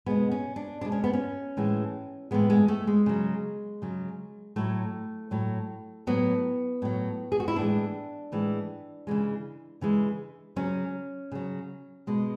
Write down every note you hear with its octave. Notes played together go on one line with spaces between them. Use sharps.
B2 G#3 B3
C#4
D4
B2 G#3 D4
C#4
B3
C#4
A2 E3 G#3
A2 E3 G#3 B3
G#3
A3
G#3
C#3 F#3
C#3 F#3
A2 F#3 A3
A2 F#3
A2 F#3 B3
A2 F#3
G#4
F#4
E4
A2 E3 G#3 D4
A2 E3 G#3
C#3 E3 G#3
C#3 E3 G#3
C#3 F#3 C#4
C#3 F#3
B2 G#3